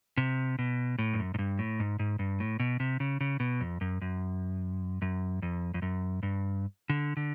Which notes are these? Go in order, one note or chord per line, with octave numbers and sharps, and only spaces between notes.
C3
B2
A2
G2
F#2
G#2
G2
A2
G#2
G#2
G2
A2
B2
C3
C#3
C#3
B2
F2
F#2
F#2
F#2
F2
F2
F#2
G2
D3
D3